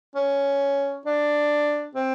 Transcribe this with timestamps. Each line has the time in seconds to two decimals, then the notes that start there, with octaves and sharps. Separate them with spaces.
0.15 C#4
1.05 D4
1.95 C4